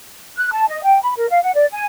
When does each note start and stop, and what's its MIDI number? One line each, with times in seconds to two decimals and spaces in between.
0.37 0.51 90
0.52 0.67 81
0.68 0.81 75
0.84 0.99 79
1.02 1.13 83
1.17 1.29 70
1.30 1.42 77
1.42 1.52 78
1.54 1.66 74
1.72 1.85 80